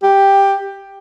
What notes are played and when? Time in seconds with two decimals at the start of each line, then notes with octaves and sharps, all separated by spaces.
0.03 G4